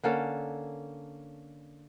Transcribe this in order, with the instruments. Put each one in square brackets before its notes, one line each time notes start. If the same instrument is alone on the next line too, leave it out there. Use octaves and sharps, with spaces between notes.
[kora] D3 A#3 C#4 A4